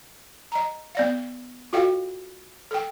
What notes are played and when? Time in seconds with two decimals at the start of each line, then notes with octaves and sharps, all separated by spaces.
0.52 D#5 A#5
0.95 B3 D5 F5
1.73 F4 F#4 A4 D#5 F5 G5
2.71 A4 G5